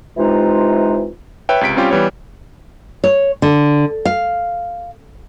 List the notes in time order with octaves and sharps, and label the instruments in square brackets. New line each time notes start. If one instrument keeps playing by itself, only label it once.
[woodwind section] C3 E3 G#3 D#4 F4
[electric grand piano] B4 C#5 E5 G5
C#2 C3 B6 D7
G3 C4 C#4 F4 G4
E3 G3 B3 C#5
[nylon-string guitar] C#5
D3
F5